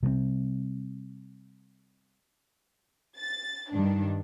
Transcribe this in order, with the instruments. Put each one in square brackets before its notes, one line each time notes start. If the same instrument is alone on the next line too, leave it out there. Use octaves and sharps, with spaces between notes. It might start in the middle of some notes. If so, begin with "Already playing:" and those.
[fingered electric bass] C3 G3 G#3 C4
[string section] A6
G2 D#3 D4